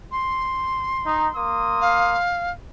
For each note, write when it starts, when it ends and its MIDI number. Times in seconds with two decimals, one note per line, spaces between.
0.12 1.36 84
1.04 1.27 63
1.36 2.17 58
1.36 2.17 84
1.36 2.17 87
1.81 2.51 77